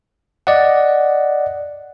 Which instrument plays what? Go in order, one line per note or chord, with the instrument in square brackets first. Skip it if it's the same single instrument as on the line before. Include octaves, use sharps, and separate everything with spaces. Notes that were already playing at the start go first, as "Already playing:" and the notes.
[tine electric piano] D5 D#5 F#5